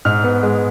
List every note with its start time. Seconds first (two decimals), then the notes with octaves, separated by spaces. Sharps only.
0.05 G#2 F6
0.24 B3
0.43 G#3